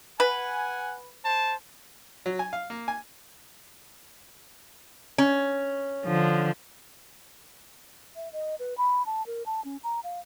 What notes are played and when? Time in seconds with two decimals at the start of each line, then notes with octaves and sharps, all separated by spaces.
0.20 B4 F#5 G#5
1.24 C5 A5
2.26 F#3
2.39 G#5
2.53 F5
2.70 A#3
2.88 G#5
5.18 C#4
6.05 D3 F3
8.16 E5
8.33 D#5
8.59 B4
8.78 B5
9.06 A5
9.26 A#4
9.46 A5
9.65 C#4
9.84 A#5
10.04 F5